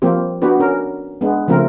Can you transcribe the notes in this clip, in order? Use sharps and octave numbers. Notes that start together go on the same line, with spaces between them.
F3 G3 A#3 C4 G4
B3 D4 F#4 G4 B4
C#4 A#4
G#3 B3 D4
C#3 F3 A3 C4 A#4